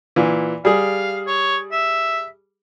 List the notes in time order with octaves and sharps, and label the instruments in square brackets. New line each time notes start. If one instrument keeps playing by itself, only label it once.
[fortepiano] A#2 E3
[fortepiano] G3 G#4 [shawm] F5
[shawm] C#5
E5